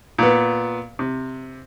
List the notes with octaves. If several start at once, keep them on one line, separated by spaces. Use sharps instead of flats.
A#2 B3
C3